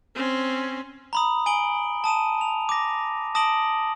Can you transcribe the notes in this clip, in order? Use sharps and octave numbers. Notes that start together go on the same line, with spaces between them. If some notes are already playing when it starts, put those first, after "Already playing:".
C4 C#4
A#5 B5 D#6
G#5 D7 F#7 G7
A5 D#6 D#7 E7
F7
D6 A#6
A5 D#6 A#6 D7 F#7 G7